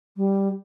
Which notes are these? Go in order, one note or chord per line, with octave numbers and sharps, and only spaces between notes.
G3